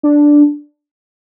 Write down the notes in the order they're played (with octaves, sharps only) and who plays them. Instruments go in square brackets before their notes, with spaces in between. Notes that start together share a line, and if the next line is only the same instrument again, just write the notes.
[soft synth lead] D4